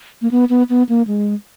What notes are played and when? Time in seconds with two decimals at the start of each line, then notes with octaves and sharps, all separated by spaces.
0.22 A#3
0.31 B3
0.50 B3
0.70 B3
0.89 A#3
1.07 G#3